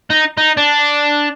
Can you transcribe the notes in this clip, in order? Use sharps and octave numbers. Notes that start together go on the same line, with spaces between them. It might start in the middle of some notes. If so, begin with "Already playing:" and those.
D#4
D#4
D4